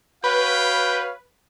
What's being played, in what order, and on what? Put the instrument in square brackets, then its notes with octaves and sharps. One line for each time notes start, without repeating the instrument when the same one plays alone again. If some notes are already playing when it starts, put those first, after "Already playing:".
[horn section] F#4 C#5 F5 [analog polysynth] B4 [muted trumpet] G5